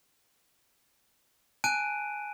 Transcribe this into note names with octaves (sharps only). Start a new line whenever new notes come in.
G#5 A5 F#6 D7 D#7